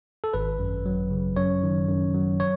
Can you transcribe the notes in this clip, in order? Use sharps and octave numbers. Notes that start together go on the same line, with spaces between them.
A4
G#1 B4
F#2
F#3
C#3
F#2 C#5
D#3
F#2
F#3
C#5